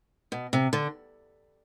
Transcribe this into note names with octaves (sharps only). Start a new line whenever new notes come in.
B2
C3
D3